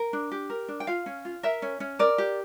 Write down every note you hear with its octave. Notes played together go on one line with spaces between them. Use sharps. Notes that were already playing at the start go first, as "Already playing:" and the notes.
Already playing: A#4
D4
G4
A#4
D4
G5
F4 F5
C#4
F4
A#4 E5
C#4
C#4
A#4 D5
G4